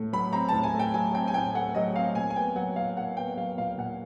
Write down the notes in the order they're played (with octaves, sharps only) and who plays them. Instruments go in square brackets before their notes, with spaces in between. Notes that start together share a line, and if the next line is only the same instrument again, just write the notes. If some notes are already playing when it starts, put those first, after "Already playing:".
Already playing: [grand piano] A2 A3
F#3 B5
C4 A#5
A2 A5
G#5
A3
G5
F#3 G#5
C4 G5
G#5
A2 G5
A3 F#5
F#3 D#5
C4 F5
A#2 G#5
G#5
B3 G5
F#3 F#5
A#2 F5
A#2 F#5
B3 G5
F#3 F5
A#2 F5
A#2 F#5